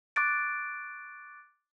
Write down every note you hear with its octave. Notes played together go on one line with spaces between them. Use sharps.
C#6 D6 F#6 A6 D7